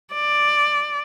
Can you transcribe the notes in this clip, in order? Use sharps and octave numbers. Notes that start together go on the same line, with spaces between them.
D5